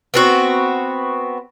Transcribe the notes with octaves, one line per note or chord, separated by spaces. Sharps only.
B3 C4 F#4